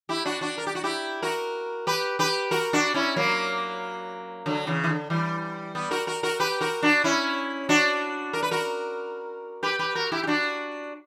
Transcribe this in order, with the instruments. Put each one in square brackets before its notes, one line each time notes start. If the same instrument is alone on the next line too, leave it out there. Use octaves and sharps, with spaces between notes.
[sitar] E4 G4
D4 F#4
D4 F#4
A#4
G4
F#4
E4 G4
F#4 A#4
G4 B4
G4 B4
F#4 A#4
D4 F#4
C#4 E4
F#3 A#3
D3 F#3
C#3 E3
E3
D3
E3 G3
G3 B3
F#4 A#4
F#4 A#4
F#4 A#4
G4 B4
F#4 A#4
D4 F#4
C#4 E4
D4 F#4
A#4
B4
F#4 A#4
G4 B4
G4 B4
F#4 A#4
E4 G4
G4
D4 F#4